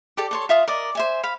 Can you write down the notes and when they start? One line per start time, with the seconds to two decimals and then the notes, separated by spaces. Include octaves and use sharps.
0.17 G4 A4 D5
0.31 A4 C#5 C6
0.49 F4 E5 F5 D#6
0.68 A#4 D5 D#5
0.95 C5 E5 G#5
1.23 F5 B5